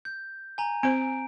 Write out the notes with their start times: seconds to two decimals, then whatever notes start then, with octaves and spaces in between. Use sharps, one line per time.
0.05 G6
0.58 G#5 A#5
0.83 C4 C5 D7